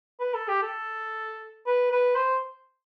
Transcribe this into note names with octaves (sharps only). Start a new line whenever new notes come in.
B4
A4
G4
A4
B4
B4
C5